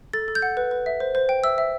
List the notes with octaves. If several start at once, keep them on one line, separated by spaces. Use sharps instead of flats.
A4 A6
A4
G6
F#5
B4
B4
E5
C5
C5
G5
E5 E6
E5